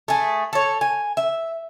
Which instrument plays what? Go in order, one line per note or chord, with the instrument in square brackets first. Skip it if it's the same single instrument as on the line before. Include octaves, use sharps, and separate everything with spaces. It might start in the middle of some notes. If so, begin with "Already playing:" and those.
[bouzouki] A3 G#4
A4 C#5
G#5
E5